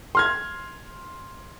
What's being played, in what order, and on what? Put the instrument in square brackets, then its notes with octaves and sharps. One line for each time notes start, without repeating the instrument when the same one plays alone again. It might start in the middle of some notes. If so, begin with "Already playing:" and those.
[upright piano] C6 F6 G#6